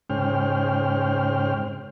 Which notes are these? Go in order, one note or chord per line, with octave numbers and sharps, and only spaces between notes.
G#2 C#3 C#4 C5 G5 F6